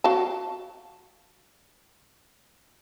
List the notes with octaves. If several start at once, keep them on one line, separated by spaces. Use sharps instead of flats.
F#4 F5 A5